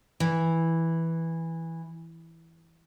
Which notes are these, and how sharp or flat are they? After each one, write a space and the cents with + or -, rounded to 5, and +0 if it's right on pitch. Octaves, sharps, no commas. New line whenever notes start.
E3 -5